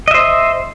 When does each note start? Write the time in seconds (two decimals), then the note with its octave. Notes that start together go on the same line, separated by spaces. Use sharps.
0.08 D#5
0.11 E5
0.14 C5